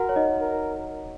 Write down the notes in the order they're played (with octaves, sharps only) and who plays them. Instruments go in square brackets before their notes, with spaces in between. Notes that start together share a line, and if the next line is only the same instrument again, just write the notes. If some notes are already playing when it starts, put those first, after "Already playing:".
Already playing: [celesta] F#4 F#5 [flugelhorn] A#4
[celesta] C#5
D#4 D#5
[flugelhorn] A#4